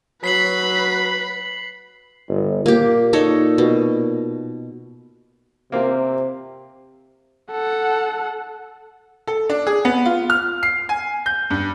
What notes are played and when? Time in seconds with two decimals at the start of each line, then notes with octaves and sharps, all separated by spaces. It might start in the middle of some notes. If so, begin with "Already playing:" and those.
0.24 F#3 B4 B5 B6 C7 F#7
2.29 G1
2.66 A#2 A#3 G4
3.13 D#4 A4 C#5
3.58 B2
5.72 C3 A#3 C4 F4
7.51 A4 F#5
9.27 A4
9.50 D4
9.67 G#4
9.85 B3
10.05 F4
10.30 F6
10.63 C7
10.89 G#5
11.26 G6
11.50 G2